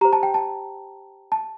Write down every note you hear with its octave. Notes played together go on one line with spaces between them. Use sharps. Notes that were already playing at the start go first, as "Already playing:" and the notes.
G4 C5 A#5
A5
G5
A5
A5